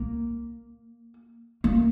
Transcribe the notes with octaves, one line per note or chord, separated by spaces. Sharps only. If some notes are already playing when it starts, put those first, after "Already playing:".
Already playing: A#3
A#3